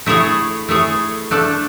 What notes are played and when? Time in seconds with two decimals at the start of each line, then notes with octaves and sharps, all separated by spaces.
0.06 A3 E4 G#4 C#5
0.69 A3 E4 G#4 C#5
1.31 A3 D4 A4 D5